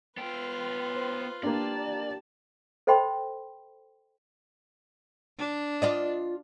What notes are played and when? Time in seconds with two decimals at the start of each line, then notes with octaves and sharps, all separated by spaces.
0.17 B3 F4 B4 G5
0.94 C5
1.43 A#3 D4 G4 D5 A5
2.87 A4 C5 D#5 G5 B5 C6
5.38 D4
5.82 F4 D5 D#5